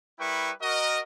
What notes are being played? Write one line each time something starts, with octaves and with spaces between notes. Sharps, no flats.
G3 E4 A#4 B4 G5 C#6
F#4 A#4 D#5